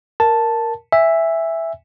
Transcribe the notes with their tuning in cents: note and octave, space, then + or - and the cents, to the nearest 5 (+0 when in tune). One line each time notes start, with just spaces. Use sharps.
A#4 +0 A5 +0
E5 +0 G#5 -25